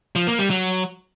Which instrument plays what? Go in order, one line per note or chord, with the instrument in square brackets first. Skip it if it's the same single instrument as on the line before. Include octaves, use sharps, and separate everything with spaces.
[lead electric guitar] F3
A#3
G3
F#3